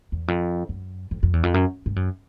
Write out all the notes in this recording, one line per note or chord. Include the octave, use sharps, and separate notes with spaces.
E2
F2
F#2
F2
F2
E2
F2
F#2
G2
F#2